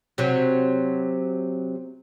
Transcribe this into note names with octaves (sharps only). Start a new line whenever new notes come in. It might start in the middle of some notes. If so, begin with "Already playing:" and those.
C3 F#3